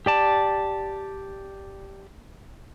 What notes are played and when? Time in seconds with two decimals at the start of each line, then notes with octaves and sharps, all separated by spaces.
0.06 G4 D5 A5